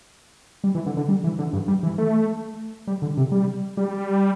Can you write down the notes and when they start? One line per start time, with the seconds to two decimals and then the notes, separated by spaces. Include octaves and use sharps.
0.64 G3
0.75 E3
0.86 D3
0.97 D3
1.08 G3
1.24 E3
1.39 D3
1.53 G2
1.68 G3
1.83 E3
1.98 A3
2.87 G3
3.02 D3
3.17 C3
3.32 G3
3.77 G3